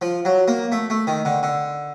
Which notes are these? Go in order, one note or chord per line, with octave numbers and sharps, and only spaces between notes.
F3
F#3
A#3
A3
A3
D#3
D3
D3